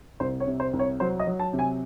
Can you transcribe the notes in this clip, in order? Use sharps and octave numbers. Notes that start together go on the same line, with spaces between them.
C2 C5
C#5
C3
C5
C2
C#5
F#3 C5
D#5
F#3
A5
C3
G#5